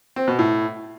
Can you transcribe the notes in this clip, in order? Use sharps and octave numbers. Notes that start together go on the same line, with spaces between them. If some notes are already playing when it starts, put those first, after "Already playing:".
C4
B2
A2